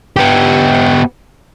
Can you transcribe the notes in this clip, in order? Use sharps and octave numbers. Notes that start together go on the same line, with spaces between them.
B3 G4